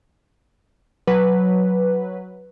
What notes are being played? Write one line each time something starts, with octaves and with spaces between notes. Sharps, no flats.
F#3 B4